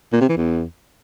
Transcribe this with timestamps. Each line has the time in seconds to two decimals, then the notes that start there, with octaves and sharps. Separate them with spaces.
0.13 A#2
0.21 C3
0.29 E3
0.37 E2